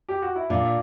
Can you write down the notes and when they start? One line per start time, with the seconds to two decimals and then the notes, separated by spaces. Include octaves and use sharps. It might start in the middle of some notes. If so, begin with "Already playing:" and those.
0.09 G4
0.22 F#4
0.36 E4
0.50 A#2 D4